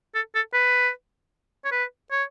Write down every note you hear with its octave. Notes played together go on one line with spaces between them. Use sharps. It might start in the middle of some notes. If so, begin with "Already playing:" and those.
A4
A4
B4
C#5
B4
C#5